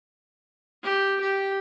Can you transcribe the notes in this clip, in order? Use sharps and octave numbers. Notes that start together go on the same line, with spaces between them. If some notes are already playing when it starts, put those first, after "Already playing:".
G4
G4